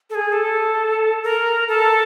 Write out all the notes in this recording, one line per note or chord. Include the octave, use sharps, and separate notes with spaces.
A4
G#4
A4
A#4
A4